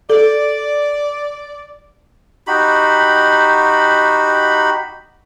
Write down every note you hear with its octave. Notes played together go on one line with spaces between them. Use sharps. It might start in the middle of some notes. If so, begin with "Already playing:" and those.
A4 D5
D#4 F#4 G4 B5